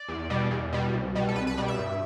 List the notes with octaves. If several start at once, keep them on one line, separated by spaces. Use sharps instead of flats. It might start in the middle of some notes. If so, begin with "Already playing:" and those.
Already playing: D5
E2
B2 G3
E2
B2 G3
C2
B2 G3
A4
C2 B4
B4
B2 G3 D5
E5
G2